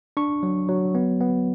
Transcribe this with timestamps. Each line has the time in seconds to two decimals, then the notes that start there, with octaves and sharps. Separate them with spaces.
0.17 D4 C#6
0.43 F#3
0.69 F#3
0.95 B3
1.20 B3